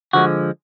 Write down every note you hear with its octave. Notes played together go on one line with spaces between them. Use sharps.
D3 F3 G#3 F#4